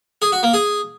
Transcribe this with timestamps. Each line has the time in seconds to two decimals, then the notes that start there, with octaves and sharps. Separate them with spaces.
0.22 G#4
0.32 F#4
0.43 A#3
0.54 G#4